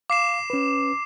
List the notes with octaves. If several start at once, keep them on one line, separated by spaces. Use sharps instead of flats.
F5 D6 C7 E7
C#4 B4